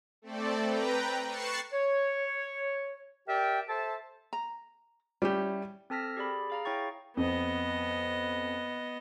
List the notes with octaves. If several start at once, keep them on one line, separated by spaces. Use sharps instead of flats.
A3 C4 A4 D5
B4 G5 A#5
C#6 F#6 A6 C7 C#7 E7
C#5
G4 A#4 D5 E5 G5
A4 C5 E5 A5
A#5
G3 C#4 E4 G4
C4 A4 A5 F6 A#6 B6
G4 G#4 D5 B5
G#4 F5 A#5
E4 C#5 G5 C#6 A6
F2 B3 D#5